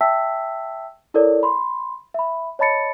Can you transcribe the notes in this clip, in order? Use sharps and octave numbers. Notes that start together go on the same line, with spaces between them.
E5 G5 A5 E6 B6
E4 A4 A#4 C#5 D5
B5 C6
E5 B5
C#5 D#5 A5 B5 A6 C#7